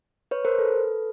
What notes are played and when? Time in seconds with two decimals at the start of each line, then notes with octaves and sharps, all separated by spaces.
0.31 B4 C#5
0.45 A#4 C5
0.58 A4 B4